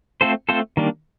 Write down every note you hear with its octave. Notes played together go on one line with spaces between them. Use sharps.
A3 C4 F4 A4 C5
A3 C4 F4 A4 C5
D#3 G3 A#3 D4